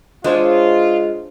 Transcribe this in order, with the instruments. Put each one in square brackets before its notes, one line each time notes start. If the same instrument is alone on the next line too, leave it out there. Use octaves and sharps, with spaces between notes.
[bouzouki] G#3 [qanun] D4 C5 C#5 [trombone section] F4